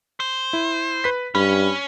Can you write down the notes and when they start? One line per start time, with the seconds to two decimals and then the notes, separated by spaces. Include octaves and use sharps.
0.20 C5
0.53 E4
1.04 B4 B6
1.35 G2 C#4 B5